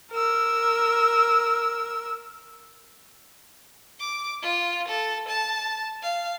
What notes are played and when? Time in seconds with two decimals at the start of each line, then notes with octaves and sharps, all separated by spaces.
0.11 A#4 E6
3.99 D6
4.42 F4
4.88 A4
5.28 A5
6.02 F5